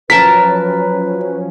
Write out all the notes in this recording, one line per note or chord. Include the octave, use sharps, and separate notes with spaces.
F3 F#3 C#4 A#4 B4 A5 B6